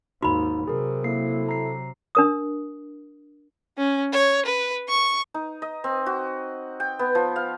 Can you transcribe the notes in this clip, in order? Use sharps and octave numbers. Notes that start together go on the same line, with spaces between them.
D#2 G#2 D#4 F#4 B5
C3 F#3 G#4 A#4
A#3 E4 A4 C7
A#5 C7
D4 A#4 D#6
C#4
C#5
B4
C#6
D#4
D#5
C4
F#4
G5
B3
F3
F5